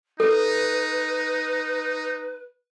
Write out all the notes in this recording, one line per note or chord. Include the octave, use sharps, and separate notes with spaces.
D#4 A4 B4